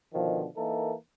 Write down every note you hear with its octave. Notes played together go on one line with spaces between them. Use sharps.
B2 D3 D#3 F3
E3 A#3 D#4 A4 A#4